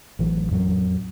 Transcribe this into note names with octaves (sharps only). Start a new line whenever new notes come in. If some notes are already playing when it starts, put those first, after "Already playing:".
A1 E3 F#3
F2 A2 F#3